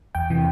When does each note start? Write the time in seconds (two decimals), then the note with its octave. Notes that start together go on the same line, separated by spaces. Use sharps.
0.15 E2 G5
0.30 C3 E3